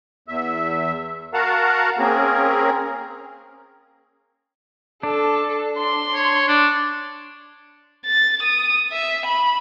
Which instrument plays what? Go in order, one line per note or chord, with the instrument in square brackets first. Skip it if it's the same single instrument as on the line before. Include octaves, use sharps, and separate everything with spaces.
[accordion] E2 E5
F#4 A#4 F5 F#5 A5 A#5
A#3 C4 C#4 G#4 A#4
[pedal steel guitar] D4 [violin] A4
[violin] C6
[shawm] C#5
D4
[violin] A6
D#6
E5
B5